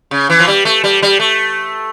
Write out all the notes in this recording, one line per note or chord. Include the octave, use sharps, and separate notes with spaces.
C#3
E3
F3
G3
A3
G3
G3
A3